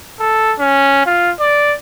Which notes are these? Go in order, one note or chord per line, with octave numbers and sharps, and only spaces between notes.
A4
C#4
F4
D5